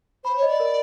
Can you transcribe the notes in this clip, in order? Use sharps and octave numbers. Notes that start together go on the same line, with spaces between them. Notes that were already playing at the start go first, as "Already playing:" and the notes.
C5 B5
C#5
D#5
D5
A#4